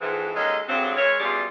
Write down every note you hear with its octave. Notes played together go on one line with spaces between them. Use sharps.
F2 G#2 E3
D#2 G#3 C#4 A4 D#5
G2 D3 F#3 G#3 C4
E3 G#3 A#4 C#5
F#2 B2 G3 F4 G#4 D5